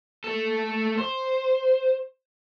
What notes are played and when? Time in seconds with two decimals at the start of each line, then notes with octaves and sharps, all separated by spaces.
0.24 A3 A4
0.98 C5